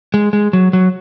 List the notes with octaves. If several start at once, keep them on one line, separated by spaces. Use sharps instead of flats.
G#3
G#3
F#3
F#3